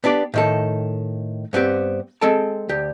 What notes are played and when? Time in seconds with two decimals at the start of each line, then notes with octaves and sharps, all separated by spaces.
0.04 B3 D4 G4 D5
0.34 A2 D#3 A4
1.53 G2 B3 C4 G4
2.21 G#3 C4 A4 G5 A5
2.69 D2 G4